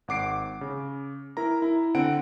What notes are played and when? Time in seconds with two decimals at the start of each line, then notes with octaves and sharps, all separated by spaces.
0.08 G#1 F#5 D6 C7 D7
0.61 C#3
1.37 E4 A#4 A#5
1.62 E4 A#5
1.95 D3 C4 F#5 D7